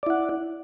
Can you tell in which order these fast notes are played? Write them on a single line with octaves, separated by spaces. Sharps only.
D5 E4 F#5